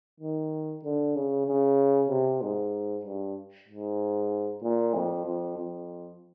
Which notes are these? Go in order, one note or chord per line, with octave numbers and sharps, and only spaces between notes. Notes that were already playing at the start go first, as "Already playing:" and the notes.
D#3
D3
C#3
C#3
C3
G#2
G2
G#2
A#2
F2
F2
F2